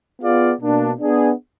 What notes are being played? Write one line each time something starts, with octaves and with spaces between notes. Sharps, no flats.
B3 F4 G#4 D5 F5
B2 A#3 D4
B3 D4 G#4